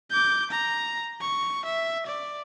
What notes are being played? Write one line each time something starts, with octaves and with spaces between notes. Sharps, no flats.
D6 G6
A#5
C#6
E5
D5